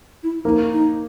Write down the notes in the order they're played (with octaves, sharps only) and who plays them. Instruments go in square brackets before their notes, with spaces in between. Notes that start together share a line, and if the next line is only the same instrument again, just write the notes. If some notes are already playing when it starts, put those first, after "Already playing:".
[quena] E4
[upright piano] A#3 [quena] D#4
[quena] D#4